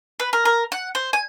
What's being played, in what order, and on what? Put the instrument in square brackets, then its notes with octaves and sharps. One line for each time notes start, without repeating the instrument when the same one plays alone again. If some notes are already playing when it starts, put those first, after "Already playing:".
[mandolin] B4
A#4
A#4
F#5
C5
G#5